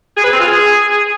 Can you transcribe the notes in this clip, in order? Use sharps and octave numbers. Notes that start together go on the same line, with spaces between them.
G#4
B4
C4
F4
G#4